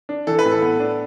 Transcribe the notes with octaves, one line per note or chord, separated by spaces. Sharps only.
D4
E3 A4
B4
A2
A4
B3
D4